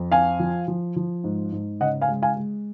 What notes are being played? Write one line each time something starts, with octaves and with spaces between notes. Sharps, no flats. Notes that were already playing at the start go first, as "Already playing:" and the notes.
Already playing: F2
C4 F5 G#5
F3
F3
F3
G#2
G#2
C#3 D#5 F#5
F5 G#5
G#3
F5 G#5
G#3